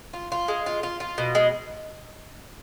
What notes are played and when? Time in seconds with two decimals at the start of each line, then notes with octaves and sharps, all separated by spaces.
0.14 F4
0.32 F4
0.48 G#3
0.66 F4
0.83 F4
1.00 F4
1.18 B2
1.35 G#3